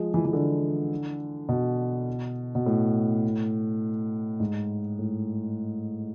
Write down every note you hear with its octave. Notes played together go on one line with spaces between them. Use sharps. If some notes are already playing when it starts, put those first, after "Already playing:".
Already playing: F3 G#3
E3
E3
D3
B2
B2
A2
G#2
A2